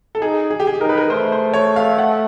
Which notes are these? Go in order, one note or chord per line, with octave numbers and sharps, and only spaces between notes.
A4
D#4 G#4
G#4
G4
G#4
D#4 A#4
B4
A#4
A3 C5
C5
C#5
F5
F#5